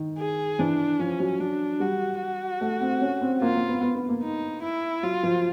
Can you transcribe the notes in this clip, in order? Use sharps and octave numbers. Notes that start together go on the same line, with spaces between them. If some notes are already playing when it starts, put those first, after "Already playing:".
Already playing: D#3
G#4
E3 D4
F3 C#4
F#3
F#3 D4
G3 F#4
F#4
A3
C4
C#4
C4
A#3 F4
A#3
B3
B3
B3
A#3
D#4
E4
F#3 F4
F3